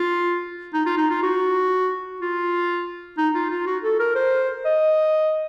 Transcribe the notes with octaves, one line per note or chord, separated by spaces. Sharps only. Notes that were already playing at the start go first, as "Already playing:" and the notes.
Already playing: F4
D#4
F4
D#4
F4
F#4
F4
D#4
F4
F4
F#4
A4
A#4
C5
D#5